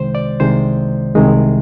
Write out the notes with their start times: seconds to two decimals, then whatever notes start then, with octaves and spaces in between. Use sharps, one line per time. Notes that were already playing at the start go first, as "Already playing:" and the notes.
Already playing: C2 C3 D#3 G#3 C5
0.15 D5
0.40 C2 C3 D#3 G#3 C5
1.15 C2 C3 D#3 G#3